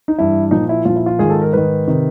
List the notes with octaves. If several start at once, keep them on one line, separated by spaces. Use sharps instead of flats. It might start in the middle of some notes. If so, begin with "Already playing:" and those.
D#4
G2 E3 E4
A#2 F3 D#4
E4
A#2 F3 F4
E4
F4
G#2 D#3 G#4
A4
A#4
G#2 D#3 B4
C3 D#3